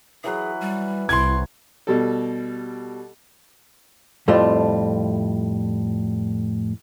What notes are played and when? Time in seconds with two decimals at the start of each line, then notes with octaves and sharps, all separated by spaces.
0.24 E3 F#3 G#4 B4
0.61 G3
1.09 C2 E4 C6 G#6
1.87 B2 G3 A4
4.28 F2 A2 G3 A3 C4 F4